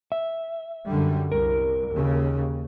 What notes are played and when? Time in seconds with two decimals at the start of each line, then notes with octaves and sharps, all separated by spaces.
0.12 E5
0.87 F#2 D3 G3
1.32 C2 A#4
1.93 D#2 C#3